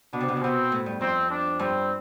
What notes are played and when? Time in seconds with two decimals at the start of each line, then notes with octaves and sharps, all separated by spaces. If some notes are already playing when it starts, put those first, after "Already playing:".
0.13 B2 D4
0.21 C3
0.28 B2
0.36 C3
0.42 B2 C4
0.72 A2
0.86 G2
1.01 F2 C4
1.30 D4
1.59 G2 C4